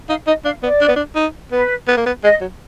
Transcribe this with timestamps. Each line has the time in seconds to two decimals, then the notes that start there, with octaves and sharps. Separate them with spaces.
0.09 D#4 F5
0.27 D#4 D#5
0.44 D4 F5
0.62 B3 D5
0.81 D4
0.88 B3
0.96 D4
1.15 D#4
1.52 B3 B4
1.88 B3
1.97 A#3
2.06 B3
2.23 G#3 D#5
2.41 F#3